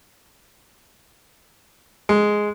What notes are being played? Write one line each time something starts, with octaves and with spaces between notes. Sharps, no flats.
G#3